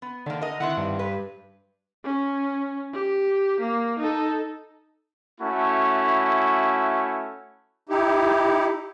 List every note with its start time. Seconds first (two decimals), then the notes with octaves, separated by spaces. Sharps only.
0.02 B3
0.26 D3 D#3 A#3
0.41 A#4 D#5
0.60 D#3 C4 E4 F#5
0.77 G2
0.99 B4
2.05 C#4
2.94 G4
3.60 A#3
3.99 D#4 A4
5.41 A3 C#4 E4 F#4
7.89 D#4 E4 G4